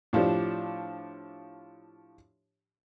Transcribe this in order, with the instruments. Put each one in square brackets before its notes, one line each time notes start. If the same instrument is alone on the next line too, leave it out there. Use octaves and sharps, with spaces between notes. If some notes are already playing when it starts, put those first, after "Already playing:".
[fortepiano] A2 F3 D4 G4